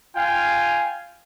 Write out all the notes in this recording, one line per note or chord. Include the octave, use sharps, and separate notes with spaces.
F4 F5 G5 G#5